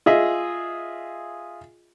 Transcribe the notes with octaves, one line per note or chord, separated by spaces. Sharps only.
F4 G#4 D#5 E5